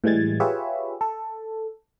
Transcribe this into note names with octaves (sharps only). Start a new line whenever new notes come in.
A2 E3 G3 G#3 G#6 A6
F4 G4 G#4 B4 C#5 E5
A4